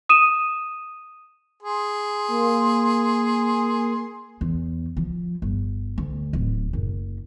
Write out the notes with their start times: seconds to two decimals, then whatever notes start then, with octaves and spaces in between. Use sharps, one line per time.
0.09 D#6 D#7 E7
1.63 G#4 C6
2.28 A#3
4.41 E2
4.97 F3
5.42 G1
5.98 D2
6.33 D1
6.73 F#1